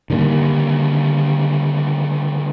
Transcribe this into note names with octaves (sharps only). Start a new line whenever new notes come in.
D3 D#3 G3 A#3